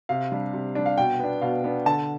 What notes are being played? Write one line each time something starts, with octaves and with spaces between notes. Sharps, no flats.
C3 F5
G3 D4
C3
G3 D4
F5
B2 G5
B3 D4
B2 F5
B3 D4
D3 A5